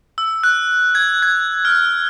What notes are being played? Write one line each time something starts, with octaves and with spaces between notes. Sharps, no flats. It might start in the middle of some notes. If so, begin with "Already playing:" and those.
E6
F#6
G#6
G#6
F6